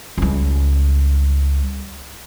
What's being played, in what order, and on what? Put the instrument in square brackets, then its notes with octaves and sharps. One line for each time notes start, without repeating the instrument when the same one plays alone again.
[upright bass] C#2 G3